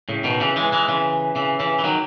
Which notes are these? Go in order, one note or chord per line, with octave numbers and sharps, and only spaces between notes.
A2 C#3
B2 D#3
C#3 E3
E3 G#3
E3 G#3
C#3 E3
C#3 E3
C#3 E3
E3
D#3 F#3